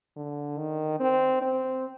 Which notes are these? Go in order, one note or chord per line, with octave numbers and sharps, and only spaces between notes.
D3
D#3
C4
C4